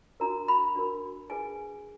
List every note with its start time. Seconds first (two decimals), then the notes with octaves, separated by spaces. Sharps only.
0.20 D4 F#4 A#4 A#5
0.48 B5
0.75 D4 F#4 A#4
1.30 D4 G#4 B4 G#5